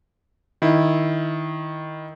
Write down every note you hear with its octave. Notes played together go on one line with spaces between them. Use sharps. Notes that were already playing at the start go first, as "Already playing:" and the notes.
D#3 E4